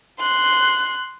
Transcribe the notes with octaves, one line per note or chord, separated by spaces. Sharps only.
C6 F#6